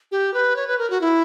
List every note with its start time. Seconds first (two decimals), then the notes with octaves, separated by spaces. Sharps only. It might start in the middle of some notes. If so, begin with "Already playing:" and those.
0.12 G4
0.34 B4
0.56 C#5
0.68 B4
0.79 A#4
0.90 F#4
1.01 E4